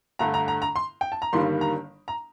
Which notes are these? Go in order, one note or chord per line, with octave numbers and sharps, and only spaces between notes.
G2 D3 A3 A#5
A#5
A#5
A#5
C6
G5
A5
A#5
G1 G2 D#3 G3 A#3 C6
A#5
A#5